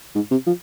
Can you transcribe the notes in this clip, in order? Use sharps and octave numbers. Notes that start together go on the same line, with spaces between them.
G#2
C3
F3